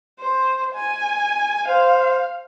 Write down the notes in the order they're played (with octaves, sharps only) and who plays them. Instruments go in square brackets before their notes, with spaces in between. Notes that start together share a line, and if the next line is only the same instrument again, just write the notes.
[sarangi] C5
G#5
[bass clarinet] C5 [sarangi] F5